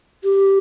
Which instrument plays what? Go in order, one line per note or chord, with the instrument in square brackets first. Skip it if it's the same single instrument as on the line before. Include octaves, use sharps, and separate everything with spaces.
[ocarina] G4